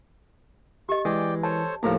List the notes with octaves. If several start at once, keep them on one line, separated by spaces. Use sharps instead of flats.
G4 D#5 C#6
E3 G#3 D5 G5
A4 C5 C#5 A5
D#2 A2 F3 A#4 A#5